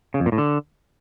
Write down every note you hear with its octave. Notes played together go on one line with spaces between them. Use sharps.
C#3
F2
A#2
A2
D3